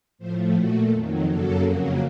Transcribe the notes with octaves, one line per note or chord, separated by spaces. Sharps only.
A2 F3 A3 C5
A#2 A3 F#4
F2 D#3 F#3
F#2 C#3 F#3 A#3 A4
F2 C#3 F#3 A#3